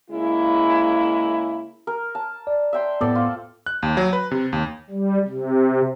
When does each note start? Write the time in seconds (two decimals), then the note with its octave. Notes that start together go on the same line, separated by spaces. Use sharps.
0.11 C#3 G#3 A#3 E4
1.87 A#4
2.15 A5
2.47 D5
2.73 E5 G5 C6
3.01 A2 B3 A4 C5 D5
3.15 F4
3.66 F#6
3.83 D#2
3.97 F#3
4.13 B4
4.31 C3
4.53 D#2
4.90 G3
5.28 C3